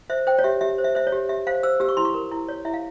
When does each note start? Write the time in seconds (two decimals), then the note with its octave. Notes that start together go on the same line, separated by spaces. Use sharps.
0.10 C5 E5
0.27 C5 G5
0.39 C#5
0.44 G4 E5
0.61 G4 E5
0.78 C5
0.84 E5
0.95 C5 E5
1.07 C#5
1.12 G4
1.29 G4 E5
1.47 C5 F5
1.63 C5 E6
1.80 G4 E6
1.89 C#6
1.97 E4 C6
2.05 C#6
2.14 A#4
2.31 E4
2.48 C#5
2.65 E4 E5
2.74 F5